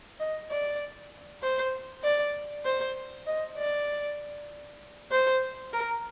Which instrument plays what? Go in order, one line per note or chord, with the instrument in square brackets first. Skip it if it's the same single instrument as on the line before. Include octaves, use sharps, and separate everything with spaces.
[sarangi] D#5
D5
C5
D5
C5
D#5
D5
C5
A#4